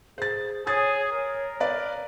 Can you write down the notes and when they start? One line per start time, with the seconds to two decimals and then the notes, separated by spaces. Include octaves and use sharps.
0.18 G#4 C5 A6
0.67 G#4 C#5 D#6 G#6 A6
1.12 A#4
1.60 B4 D5 F5